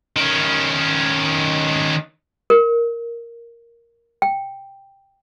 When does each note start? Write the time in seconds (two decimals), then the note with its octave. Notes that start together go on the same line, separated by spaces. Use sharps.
0.16 D#3 C#4
2.50 A#4
4.22 G5